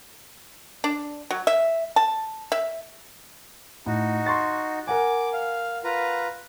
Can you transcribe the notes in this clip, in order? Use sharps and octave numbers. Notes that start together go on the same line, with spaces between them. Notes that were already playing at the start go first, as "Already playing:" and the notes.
D4
F#3
E5
A5
E5
A2 D#4 F#4
C6 C#6 A6
A#4 F#5 G#5 D6
F5
F4 B4 A#5